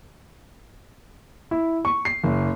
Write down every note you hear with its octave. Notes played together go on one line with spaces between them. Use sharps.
E4
C#6
C7
F#1